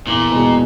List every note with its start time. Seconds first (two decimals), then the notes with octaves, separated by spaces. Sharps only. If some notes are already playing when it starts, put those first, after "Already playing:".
0.06 E2 A#2
0.32 B2 G#3